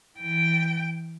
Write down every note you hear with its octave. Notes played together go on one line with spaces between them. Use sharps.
E3 G5